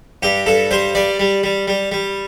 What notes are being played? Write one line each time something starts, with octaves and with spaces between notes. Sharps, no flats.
G2 G4
G2 A4
G3 C5
G3 D5
G3
G3
G3
G3